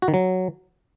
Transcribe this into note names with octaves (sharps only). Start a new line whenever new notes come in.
F#4
D#3
F#3